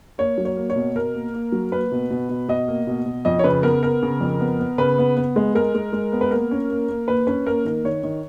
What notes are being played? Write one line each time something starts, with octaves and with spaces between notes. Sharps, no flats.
A#3 C#5
F#3
C#5
A#3
C#5
B2
B2 A#4
A#3
A#3
F#3
A#3 B4
B2
B2
B2
B2 D#5
A#3
B2
B2
F2 D#5
C#5
C#3 B4
B3 A#4
B3 A#4
C#3
F2
B3
B3
C#3 B4
B3
B3
G#3
G#3 A#4
G#3
G#3
B3
B4
A#3 A#4
C#4
A#3
A#3
D#2 B4
C#4 B4
A#3 A#4
D#3 A#4
D#3 C#5
D#3